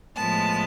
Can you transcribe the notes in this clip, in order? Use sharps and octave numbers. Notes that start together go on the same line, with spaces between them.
A2 F3 G#3 B3 A5